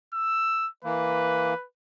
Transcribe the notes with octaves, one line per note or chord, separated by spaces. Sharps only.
E6
E3 A#3 B4